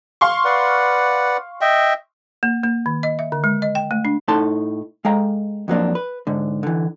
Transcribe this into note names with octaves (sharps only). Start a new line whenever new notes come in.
F5 C6 C#6
B4 D5 F#5
D#5 E5 G5
A#3
A#3
D#3
D#5
E5
D3
G#3
D#5
G5
A3
D4
A2 D#4 A4 A5 C6
G#3 A4 F5 G5 A#5
F2 F#3 A#3 D4
B4
G#2 D3
D3 E3